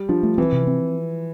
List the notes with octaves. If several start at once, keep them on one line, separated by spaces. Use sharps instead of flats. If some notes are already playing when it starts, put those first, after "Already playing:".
Already playing: G3
F3 D4
A3
E3 C4
C3
C4